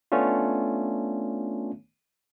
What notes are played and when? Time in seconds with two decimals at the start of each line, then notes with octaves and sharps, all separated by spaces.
0.12 A3 B3 C#4 D4 F4